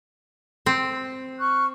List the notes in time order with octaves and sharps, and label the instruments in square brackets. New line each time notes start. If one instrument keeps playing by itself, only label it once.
[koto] C4
[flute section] C#6 F6 F#6